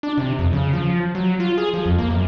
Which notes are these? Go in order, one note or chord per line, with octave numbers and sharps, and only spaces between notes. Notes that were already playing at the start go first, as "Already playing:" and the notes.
D4
C3
F2
C#3
F3
F#3
F4
G#4
F3
F2
A#3
F#2